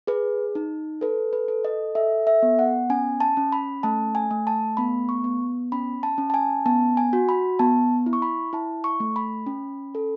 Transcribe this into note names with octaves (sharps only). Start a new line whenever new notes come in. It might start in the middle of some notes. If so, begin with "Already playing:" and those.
G#4 B4
D#4
A4 B4
B4
A4
D#5
A4 E5
E5
B3
F#5
C#4 G#5
A5
C#4
B5
A3 A5
G#5
A3
A5
B3 B5
C#6
B3
C#4 B5
A5
C#4
A5
G#5
B3 A5
G#5
F#4
B5
B3 A5
E4
C#6
B5
E4 A5
C#6
A3
B5
C#4
A4